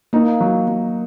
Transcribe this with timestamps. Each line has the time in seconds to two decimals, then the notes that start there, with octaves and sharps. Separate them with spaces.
0.13 A#3 D#4
0.40 F#3
0.68 F#3